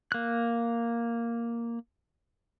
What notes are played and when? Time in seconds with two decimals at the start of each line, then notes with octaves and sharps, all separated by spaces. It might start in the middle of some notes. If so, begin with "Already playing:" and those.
0.12 A#3 F#6